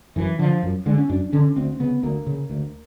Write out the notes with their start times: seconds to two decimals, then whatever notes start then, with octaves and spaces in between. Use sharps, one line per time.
0.16 F#2 E3
0.39 D3 F3
0.63 F#2
0.86 D3 G#3
0.98 C#4
1.09 F#2 D4
1.33 D3 C#4
1.56 D2 C4
1.80 C#3 B3
2.03 D2 A#3
2.27 C#3
2.50 D2